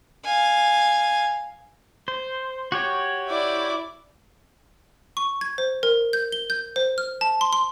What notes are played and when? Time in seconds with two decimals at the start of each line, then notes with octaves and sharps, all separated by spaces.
0.25 F5 G#5
2.08 C5
2.72 F#4 G4 C#5
3.29 E4 D5
5.17 C#6
5.41 G#6
5.58 C5
5.83 A#4
6.13 G6
6.32 G7
6.50 G6
6.76 C5
6.98 F6
7.21 A5
7.41 C6
7.53 C6